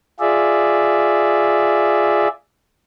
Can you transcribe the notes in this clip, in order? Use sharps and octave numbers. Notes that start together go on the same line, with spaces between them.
F4 G#4 D5 E5